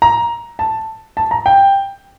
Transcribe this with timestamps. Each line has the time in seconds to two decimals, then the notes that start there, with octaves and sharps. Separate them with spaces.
0.02 A#5
0.59 A5
1.17 A5
1.31 A#5
1.46 G5